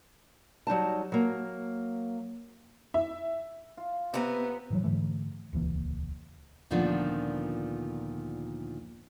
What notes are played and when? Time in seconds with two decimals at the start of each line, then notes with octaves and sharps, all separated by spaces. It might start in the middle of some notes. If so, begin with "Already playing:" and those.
0.67 F#3 G3 D#4 A5
1.12 F#3 A#3
2.94 E5
3.77 F4
4.14 C3 B3 B4 A#5
4.70 A2 E3 F#3
4.84 G#2 D3 E3 A3
5.53 D#1 C#2 E3 A#3
6.71 D2 A#2 D#3 F3 B3 D4